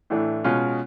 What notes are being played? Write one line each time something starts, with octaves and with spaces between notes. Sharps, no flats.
A2 E3 A3 D4
B2 G#3 C#4 F4